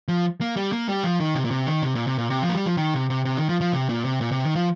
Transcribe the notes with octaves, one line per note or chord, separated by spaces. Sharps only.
F3
A#3
G3
A#3
G3
F3
D#3
C3
A#2
C3
D#3
C3
A#2
C3
A#2
C3
F3
A#3
G3
F3
D#3
C3
C3
C3
D#3
F3
F3
C3
A#2
C3
A#2
C3
D#3
F3